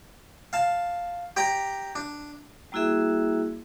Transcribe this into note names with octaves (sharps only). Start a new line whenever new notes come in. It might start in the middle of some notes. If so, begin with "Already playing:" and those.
F5 A5
G4 D5 G5 A#5
D4
G3 A#3 E4 F#4 G#4 E5